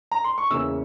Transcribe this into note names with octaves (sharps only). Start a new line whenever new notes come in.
A#5
C6
C#6
E2 C#3 E3 A#3 E6